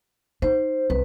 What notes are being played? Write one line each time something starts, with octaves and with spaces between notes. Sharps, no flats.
D#4 C5
C2 B4